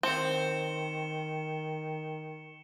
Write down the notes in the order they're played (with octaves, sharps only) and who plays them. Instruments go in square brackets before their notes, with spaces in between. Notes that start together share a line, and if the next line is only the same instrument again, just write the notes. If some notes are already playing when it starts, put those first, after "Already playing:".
[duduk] D#3 [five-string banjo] C4 [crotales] C#7 E7 G7